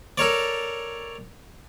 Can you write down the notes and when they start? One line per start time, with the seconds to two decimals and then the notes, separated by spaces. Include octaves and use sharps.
0.18 A4 A#4 C#5 D5